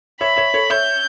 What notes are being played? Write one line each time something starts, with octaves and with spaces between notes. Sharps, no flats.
C#5 E5 B5
C#5 E5
A4 C#5
C#5 E5 G6